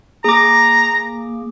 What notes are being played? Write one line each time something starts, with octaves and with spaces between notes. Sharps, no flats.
A#3 G#4 A#5 D6